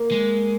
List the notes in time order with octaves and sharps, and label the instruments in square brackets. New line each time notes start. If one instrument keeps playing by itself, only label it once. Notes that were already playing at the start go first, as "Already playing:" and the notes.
Already playing: [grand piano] A#3
[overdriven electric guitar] G#3